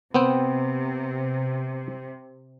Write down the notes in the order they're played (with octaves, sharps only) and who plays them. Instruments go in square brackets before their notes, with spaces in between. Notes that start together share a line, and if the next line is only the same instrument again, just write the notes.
[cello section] C3 [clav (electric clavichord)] B3 C4 G5